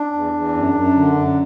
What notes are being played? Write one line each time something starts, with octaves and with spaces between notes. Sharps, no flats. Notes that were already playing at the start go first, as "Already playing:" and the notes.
Already playing: D4
E2
E2
F#2
F#2
D3
F#2